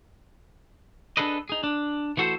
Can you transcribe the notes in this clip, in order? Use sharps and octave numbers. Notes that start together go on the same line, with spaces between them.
D4 F4 G#4 A4 B4 D#5
D#4 G#4
D4
E3 A3 F#4 A4 C5